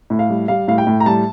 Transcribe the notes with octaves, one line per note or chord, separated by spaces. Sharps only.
A2
F5
G3
G3 F5
A2 F5
G5
A2
A#5
G3 A5